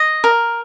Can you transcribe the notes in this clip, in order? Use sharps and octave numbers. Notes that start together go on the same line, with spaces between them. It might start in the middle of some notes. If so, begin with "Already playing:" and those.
Already playing: D#5
A#4